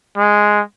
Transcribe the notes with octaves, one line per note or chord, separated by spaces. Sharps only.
G#3